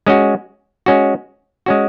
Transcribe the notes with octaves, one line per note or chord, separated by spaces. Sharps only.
G#3 C#4 F#4
G#3 C#4 F#4
G#3 C#4 F#4